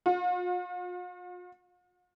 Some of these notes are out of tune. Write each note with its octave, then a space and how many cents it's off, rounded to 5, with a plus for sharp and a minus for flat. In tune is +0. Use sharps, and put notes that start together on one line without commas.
F4 +45